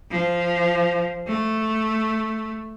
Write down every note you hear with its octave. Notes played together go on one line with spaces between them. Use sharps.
F3
A3